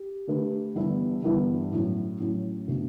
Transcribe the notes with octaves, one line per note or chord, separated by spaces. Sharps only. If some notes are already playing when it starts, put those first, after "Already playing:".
Already playing: G4
D3 A3 D4 G4 B4
G1 G2 E3 B3 E4
G1 G2 E3 B3 E4
A2 F#3 C#4
A2 F#3 C#4
B2 A3 D4